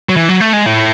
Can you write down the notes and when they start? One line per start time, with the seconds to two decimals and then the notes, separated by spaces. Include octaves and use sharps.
0.09 F#3
0.17 E3
0.29 F#3
0.40 A3
0.53 G#3
0.66 A2